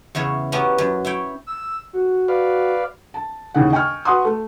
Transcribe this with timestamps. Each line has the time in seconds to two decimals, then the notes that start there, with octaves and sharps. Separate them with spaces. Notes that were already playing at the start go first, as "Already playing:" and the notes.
0.15 E2 C#3 E4 C#5
0.52 B3 C#4 E4 F#4 G4 A#4
0.78 F#2
1.05 E4 C#5 G5
1.47 E6
1.93 F#4
2.28 B4 D5 F5
3.14 A5
3.54 D#2 C#3 E3 G#4 F#5
3.72 D#5 G5 G#5 C#6 F6
4.05 F#4 B4 F#5 C6 D#6
4.25 A3